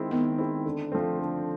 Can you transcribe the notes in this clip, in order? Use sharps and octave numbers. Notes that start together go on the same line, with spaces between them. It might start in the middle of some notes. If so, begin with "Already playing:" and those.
Already playing: D#3 G#3 C4 E4
D#3 B3
G#3 C4 E4
D3
F3 A3 C4
D3